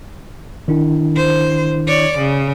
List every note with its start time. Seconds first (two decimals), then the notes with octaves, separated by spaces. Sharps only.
0.68 D#3 D4 E4
1.16 C5
1.87 C#5 D5
2.18 C#3